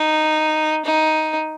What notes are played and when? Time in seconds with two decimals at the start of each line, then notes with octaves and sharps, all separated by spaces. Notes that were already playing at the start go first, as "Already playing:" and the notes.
Already playing: D#4
0.85 D#4